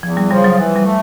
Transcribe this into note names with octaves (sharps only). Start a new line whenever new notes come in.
E2 F3
G3
C#3 F3 G3
F#3
E3 F#3
G3
A3